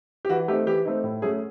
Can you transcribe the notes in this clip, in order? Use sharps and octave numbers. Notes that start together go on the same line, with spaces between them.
G4
E3 F#4
A3 C4 D#4 G4
E3 G4
A3 C4 D#4
A2
F#3 A3 C#4 G#4